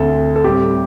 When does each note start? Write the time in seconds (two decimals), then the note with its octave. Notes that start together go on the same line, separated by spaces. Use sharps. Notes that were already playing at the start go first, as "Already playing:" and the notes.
Already playing: D2 D3 C4 A4
0.36 A4
0.44 A2 G3 C4 G4